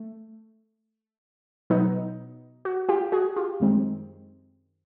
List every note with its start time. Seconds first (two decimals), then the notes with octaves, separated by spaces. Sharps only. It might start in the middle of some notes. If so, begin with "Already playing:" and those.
Already playing: A3
1.70 B2 F#3 B3 D#4
2.65 F#4
2.89 F4 G4
3.12 F#4 G#4
3.36 F4 G4
3.60 F#2 D#3 G#3 C4 D#4